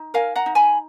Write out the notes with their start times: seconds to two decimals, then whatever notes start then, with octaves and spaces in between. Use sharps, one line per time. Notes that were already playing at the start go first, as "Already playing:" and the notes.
Already playing: D#4
0.14 A#4 F5 G#5
0.36 F#5 A#5
0.46 D#4
0.55 G#5 B5